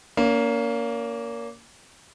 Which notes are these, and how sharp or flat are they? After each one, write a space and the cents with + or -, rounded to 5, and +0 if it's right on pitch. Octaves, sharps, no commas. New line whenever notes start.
A#3 +0 C#4 +40